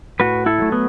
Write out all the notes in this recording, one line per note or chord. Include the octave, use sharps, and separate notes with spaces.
A2 F#4 B4
E4 A4
F#3 A3
B3